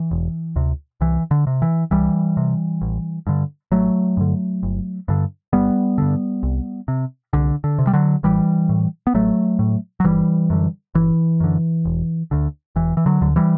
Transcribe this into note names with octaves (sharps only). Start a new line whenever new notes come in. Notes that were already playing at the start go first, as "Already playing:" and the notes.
Already playing: E3
E1
D2 C3
C2 E3
D3
C3
E3
C2 E3 G3
C3
A1
G2 D3
A1 F#3 A3
G2 D3
G1
G2 D3
G1 G3 B3
G2 D3
C2
C3
C2 D3
D3
C3
G3
D3 F#3
A1 E3 G3
A2
B3
A1 F#3 A3
A2
F#3
G1 E3 G3
F#2 D3
G1 E3
F#2 D3
E1
D2 D3
E1 E3
E3
D3 F#3
D2 D3
E3 G3